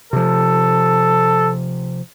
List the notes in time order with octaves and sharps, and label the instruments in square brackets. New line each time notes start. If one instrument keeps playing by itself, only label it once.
[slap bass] C3 F3 [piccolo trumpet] A4